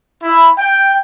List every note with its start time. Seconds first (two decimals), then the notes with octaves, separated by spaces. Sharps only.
0.23 E4
0.58 G5